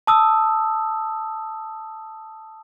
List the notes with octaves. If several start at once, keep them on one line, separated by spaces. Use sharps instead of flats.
A5 D#6 E6